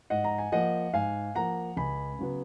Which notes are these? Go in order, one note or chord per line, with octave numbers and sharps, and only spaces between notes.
G#2 D#5 F#5
A#5
G#5
F3 A#3 D#5 F#5
G#2 F5 G#5
F3 A#3 F#5 A#5
C#2 G#5 B5
C#3 F#3 B3